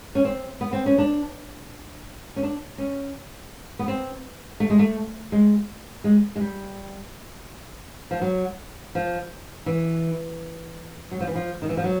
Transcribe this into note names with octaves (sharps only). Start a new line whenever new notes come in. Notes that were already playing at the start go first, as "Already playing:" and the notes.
C#4
C4
B3
C4
C#4
D4
C#4
D4
C#4
B3
C4
A3
G#3
A3
G#3
G#3
G#3
G3
F3
F#3
F3
E3
F#3
F3
E3
F3
D#3
E3
F3
F#3